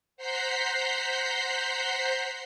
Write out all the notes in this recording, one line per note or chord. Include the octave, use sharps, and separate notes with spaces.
C5 F#5 A#5 G6 B6 C7